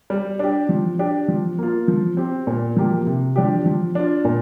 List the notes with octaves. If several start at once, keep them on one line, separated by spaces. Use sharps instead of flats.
G3
D4 G4
F3
D4 G4
F3
A#3 F4
F3
C4 G4
A#2
F3 A#3 G4
C3
F3 D4 G4
F3
D4 F4
A#2